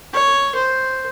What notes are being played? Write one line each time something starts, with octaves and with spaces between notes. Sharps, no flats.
C#5
C5